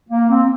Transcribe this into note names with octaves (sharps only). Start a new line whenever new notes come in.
A#3
C4